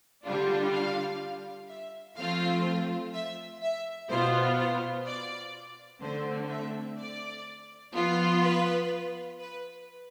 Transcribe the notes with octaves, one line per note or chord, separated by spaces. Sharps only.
D3 G3 D4 F4
F5
E5
F3 A3 C4 F4 F5
E5
E5
B2 B3 F4 C5
C5
D5
D3 A3 C4 C5
E5
D5
F3 B3 F4
B4
B4